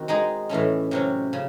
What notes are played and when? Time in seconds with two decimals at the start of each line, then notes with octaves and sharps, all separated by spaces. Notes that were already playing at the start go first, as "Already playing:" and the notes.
Already playing: D#3 C4 F#4
0.08 G#3 D#4 G#4
0.49 A2 E3 A3 C#4
0.91 C3 F#3 C#4
1.33 C#3